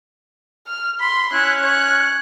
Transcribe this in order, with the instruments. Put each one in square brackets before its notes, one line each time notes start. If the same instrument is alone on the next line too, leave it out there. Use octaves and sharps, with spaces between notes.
[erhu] F6
[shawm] B5 [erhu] C6
[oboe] C#4 [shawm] E4 [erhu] F#6
[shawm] C#5 [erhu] F#6